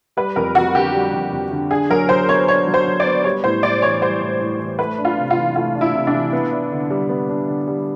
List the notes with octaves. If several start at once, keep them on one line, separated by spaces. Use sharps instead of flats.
G3 B4
F2 A#4
F2 F#4
D3 G4
G3
F2
F2
D3
D4 G#4
F#3 A#4
F#3 C5
B3 C#5
D4 C#5
F#3
C5
F#3
D5
B3
G3 C#5
A2 C5
A2 D5
E3 C#5
G3 C5
A2
A2
E3
A3 B4
D4
F4
C3
F4
E3
A3 F4
D4
E4
C3
D4
E3
B3
D4
D3
G3
B3
D4
D3
G3